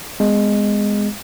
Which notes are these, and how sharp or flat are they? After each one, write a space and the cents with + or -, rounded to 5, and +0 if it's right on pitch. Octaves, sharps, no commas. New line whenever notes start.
G#3 -10 B3 +30